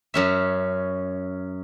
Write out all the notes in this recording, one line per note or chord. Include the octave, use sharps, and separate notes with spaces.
F#2 C#4 E5